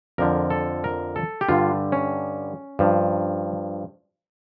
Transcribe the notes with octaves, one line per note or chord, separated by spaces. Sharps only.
F2 D3 F3 A#4
A4
A#4
A4
G4
G2 D3 G3 F4
C#4
G2 F3